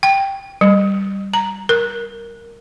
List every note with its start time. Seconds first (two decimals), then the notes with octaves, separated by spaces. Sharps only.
0.03 G5
0.61 G3
1.34 A#5
1.69 A#4